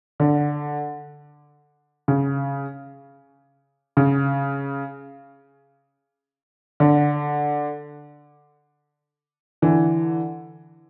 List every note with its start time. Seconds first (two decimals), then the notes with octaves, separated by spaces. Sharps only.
0.20 D3
2.08 C#3
3.97 C#3
6.80 D3
9.62 D3 E3